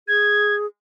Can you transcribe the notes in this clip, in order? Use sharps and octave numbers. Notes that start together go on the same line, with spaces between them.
G#4 G#6